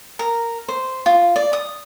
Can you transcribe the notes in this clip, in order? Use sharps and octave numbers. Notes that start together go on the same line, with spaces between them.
A#4
C5
F4
D5
D#6